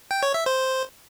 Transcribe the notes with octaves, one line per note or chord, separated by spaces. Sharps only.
G5
C#5
E5
C5